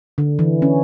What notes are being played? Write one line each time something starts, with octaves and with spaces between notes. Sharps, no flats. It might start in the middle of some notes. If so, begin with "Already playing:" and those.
D3
E3
C#4